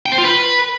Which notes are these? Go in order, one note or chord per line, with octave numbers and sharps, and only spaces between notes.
G5
C5
F4
B4